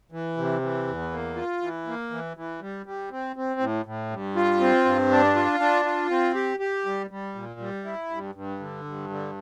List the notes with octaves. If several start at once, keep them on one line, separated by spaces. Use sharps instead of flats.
E3
C3
E3
E2
A#3
F4
E3
A#3
E3
E3
G3
G3
C4
C4
A2
A2
G2
F4
C4
G2
D4
F4
D4
F4
C4
G4
G4
G3
G3
A#2
G3
E4
G2
G2
D3
G2
D3